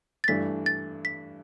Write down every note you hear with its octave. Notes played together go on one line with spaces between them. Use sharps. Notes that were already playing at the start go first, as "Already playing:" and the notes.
A6
G2 E3 A3 D4 B6
A6
B6